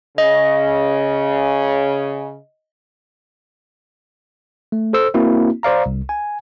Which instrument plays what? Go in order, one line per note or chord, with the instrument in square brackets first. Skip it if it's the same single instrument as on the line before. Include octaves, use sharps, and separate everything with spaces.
[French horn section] C#3 [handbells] D#5
[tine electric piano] A3
A4 C5 E6
A#3 C4 E4 F#4
C5 D5 F5 A#5
C2
G#5